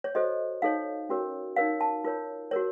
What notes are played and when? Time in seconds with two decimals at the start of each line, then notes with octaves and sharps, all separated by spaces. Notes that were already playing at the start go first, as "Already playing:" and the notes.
0.04 C#5
0.15 F#4 A4 C5 D#5
0.62 D#4 A4 C#5 F5
1.09 C#4 F#4 A#4 C#5
1.56 D#4 A#4 C#5 F5
1.81 A5
2.04 F4 A#4 C#5
2.51 F#4 A#4 C#5